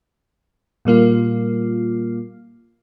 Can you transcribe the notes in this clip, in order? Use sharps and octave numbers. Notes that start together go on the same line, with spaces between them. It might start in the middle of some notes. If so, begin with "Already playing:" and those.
A#2 G3 A#3 F4